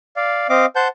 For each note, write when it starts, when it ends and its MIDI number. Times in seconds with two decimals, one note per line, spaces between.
0.16 0.47 74
0.16 0.47 77
0.49 0.66 60
0.49 0.66 75
0.49 0.66 77
0.49 0.66 86
0.76 0.88 72
0.76 0.88 78
0.76 0.88 81
0.76 0.88 91